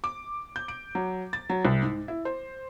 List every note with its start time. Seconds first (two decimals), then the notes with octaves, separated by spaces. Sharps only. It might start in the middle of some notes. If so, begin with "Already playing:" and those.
0.04 D6
0.56 G6
0.68 D7
0.95 F#3
1.33 A6
1.50 F#3
1.65 C2
1.83 G#2
2.08 E4
2.25 C5